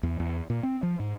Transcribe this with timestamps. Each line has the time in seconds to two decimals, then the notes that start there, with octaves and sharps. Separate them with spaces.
0.03 E2
0.20 E2
0.50 A#2
0.63 C4
0.83 F3
1.00 G#2